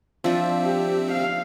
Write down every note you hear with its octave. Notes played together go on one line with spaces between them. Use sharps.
F3 C4 D4 E5
G4
F5